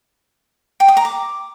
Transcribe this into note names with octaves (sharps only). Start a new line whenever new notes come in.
G5
D#6
A#5
D6